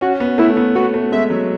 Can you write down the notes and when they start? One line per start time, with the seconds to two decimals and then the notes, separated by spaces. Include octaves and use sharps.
0.01 C#4 F#4
0.20 B3
0.38 A3 E4
0.57 B3
0.75 B3 F#4
0.94 A3
1.12 G#3 E5
1.30 F#3